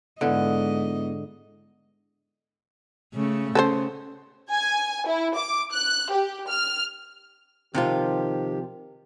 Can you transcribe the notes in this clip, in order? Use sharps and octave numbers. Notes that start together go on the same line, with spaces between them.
G#2 D3 B3 E4 D#5
C#3 A3 C#4
C#3 A4 B4 C5
G#5
E4
D6
F#6
G4
F6
C3 D#3 F3 F4 G4